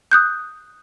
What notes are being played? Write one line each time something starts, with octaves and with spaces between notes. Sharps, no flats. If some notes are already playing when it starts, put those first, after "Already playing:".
D#6 F#6 G6